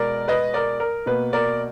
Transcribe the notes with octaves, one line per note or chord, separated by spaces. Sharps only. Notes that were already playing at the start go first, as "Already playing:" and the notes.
Already playing: B2 G#3 A#4 D5
B4 D#5
A#4 D5
A#4
B2 A#3 B4
A#4 D5